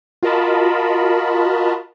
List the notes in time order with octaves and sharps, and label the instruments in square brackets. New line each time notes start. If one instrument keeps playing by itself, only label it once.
[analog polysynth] F4 F#4 A#4 D#5 A5 B5